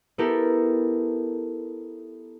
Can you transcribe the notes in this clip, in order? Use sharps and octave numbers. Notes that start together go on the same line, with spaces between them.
B3 E4 G4 A4 A#4